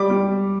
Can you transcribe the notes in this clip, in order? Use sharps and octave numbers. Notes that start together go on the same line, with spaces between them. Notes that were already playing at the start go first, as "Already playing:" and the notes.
Already playing: G3 D6
G3